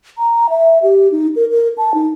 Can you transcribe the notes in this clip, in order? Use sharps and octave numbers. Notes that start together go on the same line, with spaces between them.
A#5
E5
G4
D#4
A#4
A#4
A5
D#4